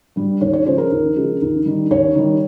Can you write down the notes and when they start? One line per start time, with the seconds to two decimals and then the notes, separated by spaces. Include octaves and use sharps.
0.16 G2 G3
0.41 D#2 C#5
0.53 C#5
0.65 C#3 F3 G#3 C5
0.78 A#4
0.91 D#2
1.16 C#3 F3 G#3
1.41 D#2
1.65 D#3 G3
1.90 D#2 C#5
2.15 D#3 G3